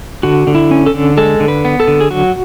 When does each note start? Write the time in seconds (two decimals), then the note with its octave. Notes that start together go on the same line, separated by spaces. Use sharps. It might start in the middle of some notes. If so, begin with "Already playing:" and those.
0.23 D3 F#4
0.47 D3
0.55 E4
0.71 C#4
0.86 A4
0.94 D3
1.17 G#3 A4
1.40 D3
1.48 B4
1.65 B3
1.80 A4
1.88 D3
2.01 G#4
2.11 F#3 F#4